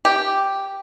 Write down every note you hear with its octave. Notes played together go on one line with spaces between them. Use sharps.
G4